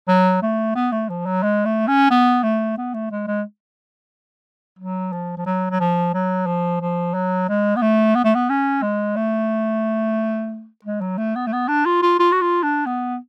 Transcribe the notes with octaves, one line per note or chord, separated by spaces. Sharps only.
F#3
A3
B3
A3
F3
F#3
G#3
A3
C#4
B3
A3
B3
A3
G#3
G#3
F#3
F3
F3
F#3
F#3
F3
F#3
F3
F3
F#3
G#3
B3
A3
B3
A3
B3
C#4
G#3
A3
G#3
F#3
A3
B3
A3
B3
D4
F4
F4
F4
F#4
F4
D4
B3